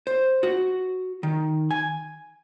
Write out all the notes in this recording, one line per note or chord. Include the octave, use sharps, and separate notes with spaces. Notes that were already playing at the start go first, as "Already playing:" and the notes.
C5
F#4
D#3
G#5